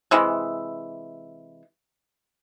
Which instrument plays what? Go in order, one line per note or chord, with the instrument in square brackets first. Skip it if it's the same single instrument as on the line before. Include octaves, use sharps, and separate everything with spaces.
[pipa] C3 E3 G#3